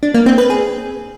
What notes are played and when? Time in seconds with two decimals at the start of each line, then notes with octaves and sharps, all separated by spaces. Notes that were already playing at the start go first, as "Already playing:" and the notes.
0.03 D4
0.14 A#3
0.26 C4
0.38 B4
0.50 G#4